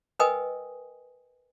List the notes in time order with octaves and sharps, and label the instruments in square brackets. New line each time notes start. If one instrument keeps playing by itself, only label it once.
[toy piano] A#4 B4 D#5 G5 G#5 D#6